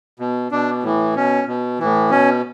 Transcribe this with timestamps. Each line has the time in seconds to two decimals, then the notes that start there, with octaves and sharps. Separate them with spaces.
0.19 B2
0.51 B2 D4
0.83 A2 E3
1.15 B2 C#4
1.47 B2
1.79 A2 E3
2.10 B2 C#4